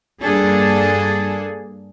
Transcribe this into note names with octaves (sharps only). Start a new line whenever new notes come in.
G2 A#3 D4 G#4 A4